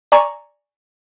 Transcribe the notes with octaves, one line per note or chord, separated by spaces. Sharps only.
D5 G#5 A#5 C#6 E6